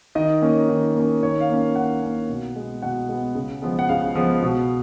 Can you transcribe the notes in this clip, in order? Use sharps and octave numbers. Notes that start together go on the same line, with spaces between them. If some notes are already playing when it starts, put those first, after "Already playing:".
D#3 D#5
A#3 C#4
D#3
A#3 C#4
D#3 C#5
F5
A#3 C#4
D#3 F#5
A#3 C#4
B2
G#3 B3
B2 F#5
G#3 B3
C#3
F3 G#3 B3
F#5
C#3 F5
F3 G#3 B3
B2